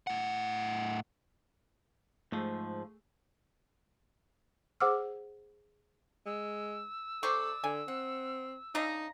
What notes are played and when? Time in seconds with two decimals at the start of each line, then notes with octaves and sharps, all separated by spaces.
0.07 A2 F#5
2.32 G#2 F3 A3 G#4
4.80 G#4 C5 F#5 D6 E6 F6
6.26 G#3 E6
7.23 C3 A4 C5 D5 C#6
7.64 D3 G#5
7.88 C4 F#5
8.75 C#3 D4 D#4 D#5 A#5